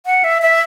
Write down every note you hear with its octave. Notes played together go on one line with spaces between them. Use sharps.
F#5
E5
E5